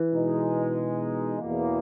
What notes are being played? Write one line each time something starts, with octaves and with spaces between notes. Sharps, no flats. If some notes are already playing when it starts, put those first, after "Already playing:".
Already playing: E3
B2 G#3 D#4
E2 B2 A#3